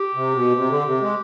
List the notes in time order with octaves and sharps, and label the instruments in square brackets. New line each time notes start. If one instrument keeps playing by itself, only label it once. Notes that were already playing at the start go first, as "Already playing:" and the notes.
Already playing: [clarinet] G4
[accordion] C3
B2
C3
D3
C3
G#3